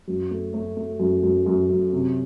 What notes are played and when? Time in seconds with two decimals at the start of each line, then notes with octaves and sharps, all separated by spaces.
0.08 F#2
0.31 A3
0.54 A3
0.77 A3
1.00 F#2
1.23 F#2
1.46 F#2
1.69 F#2
1.93 C3